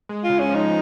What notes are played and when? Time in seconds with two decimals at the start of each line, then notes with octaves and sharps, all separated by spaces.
0.09 G#3
0.24 F4
0.30 C#3
0.39 C#4
0.49 F3
0.55 D#4